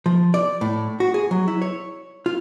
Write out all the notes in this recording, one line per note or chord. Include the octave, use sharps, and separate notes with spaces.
F3
D5
A2
F#4
G#4
F#3
E4
C#5
F4